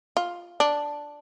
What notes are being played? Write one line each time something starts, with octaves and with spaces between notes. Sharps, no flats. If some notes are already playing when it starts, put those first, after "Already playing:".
F4
D4